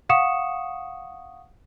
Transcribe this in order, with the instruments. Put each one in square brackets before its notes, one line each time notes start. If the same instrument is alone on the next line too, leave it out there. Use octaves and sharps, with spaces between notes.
[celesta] F5 F#5 C#6 D#6 C#7 E7